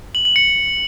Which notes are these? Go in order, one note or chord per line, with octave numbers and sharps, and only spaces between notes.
F#7
F#7
C#7